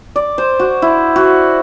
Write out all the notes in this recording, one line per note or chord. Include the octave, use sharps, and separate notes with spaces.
D5
C5
F#4
E4
F#4